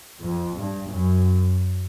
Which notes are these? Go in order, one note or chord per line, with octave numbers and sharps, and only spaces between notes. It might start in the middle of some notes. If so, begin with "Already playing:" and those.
F2
G2
F#2